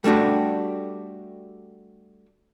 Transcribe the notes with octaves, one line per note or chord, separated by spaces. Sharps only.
G3 A3 D4 F#4 G4